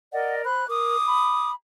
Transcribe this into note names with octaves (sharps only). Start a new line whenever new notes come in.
A#4 D5 D#5 F#5
C5 B5 F#6
A#4 D6 D#6
B5